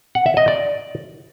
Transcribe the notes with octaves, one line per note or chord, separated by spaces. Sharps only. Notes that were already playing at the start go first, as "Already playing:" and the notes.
F#5
E5
D#5
D5